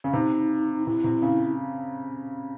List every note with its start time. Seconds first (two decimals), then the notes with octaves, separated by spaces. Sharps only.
0.04 C#3
0.13 C3 D#4
0.86 C3 E4
1.04 C3
1.22 C#3